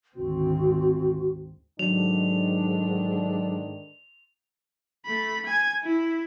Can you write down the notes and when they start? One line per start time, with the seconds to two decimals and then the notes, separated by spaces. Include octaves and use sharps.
0.16 G#1 D2 C4 F#4
1.79 G#2 D3 D#3 F#3 D4 F7
5.06 A3 B5
5.46 G#5 G#6
5.84 E4